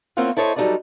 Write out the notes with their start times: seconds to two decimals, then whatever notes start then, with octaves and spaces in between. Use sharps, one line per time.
0.17 A#3 C4 C#4 E4 F4 F#5
0.37 E4 A4 C5 C#5 D#5
0.56 F#3 G3 D#4 A4 B4 D5